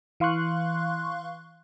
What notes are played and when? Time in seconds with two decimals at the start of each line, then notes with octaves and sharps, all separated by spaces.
0.20 E3 F5 C6 C#6 F#6